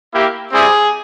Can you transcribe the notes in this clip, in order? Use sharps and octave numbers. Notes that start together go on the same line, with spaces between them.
A#3 E4 G4
G3 C4 E4 G4 G#4